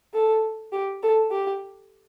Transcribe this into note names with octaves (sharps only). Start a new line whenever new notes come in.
A4
G4
A4
G4